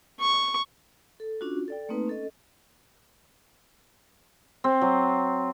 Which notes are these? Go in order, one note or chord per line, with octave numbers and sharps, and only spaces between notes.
C#6
A4
C#4 D4 F4 F#4
A4 D5 G5
A3 A#3 C4 D#4 B4
C#4 A4 D#5
C4
F#3